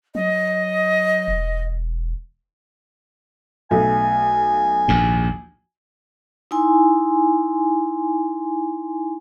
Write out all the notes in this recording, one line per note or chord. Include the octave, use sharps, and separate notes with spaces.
F#3 D#5
E1
B1 A3 G#5
A#1 D#2 G#2
D#4 E4 G#5 C6